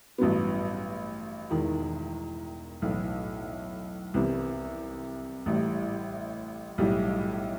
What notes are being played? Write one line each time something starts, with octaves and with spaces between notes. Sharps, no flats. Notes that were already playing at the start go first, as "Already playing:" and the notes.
A1 G2 F#3 B3
E1 E2 D#3
B1 A2 E3
C2 C3 E3 G3 B3
A1 A2 G3
B1 A2 G3